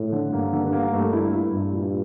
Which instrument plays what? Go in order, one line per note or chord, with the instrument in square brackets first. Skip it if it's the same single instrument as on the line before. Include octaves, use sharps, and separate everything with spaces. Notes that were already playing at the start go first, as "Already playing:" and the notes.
Already playing: [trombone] A2
[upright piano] D3
[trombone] G2 [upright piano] A#3
[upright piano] D3
A#3
[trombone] G2 [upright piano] A3
[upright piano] E4
E4
[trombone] G2 [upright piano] E4
[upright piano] A#2